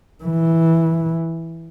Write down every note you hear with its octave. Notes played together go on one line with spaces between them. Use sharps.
E3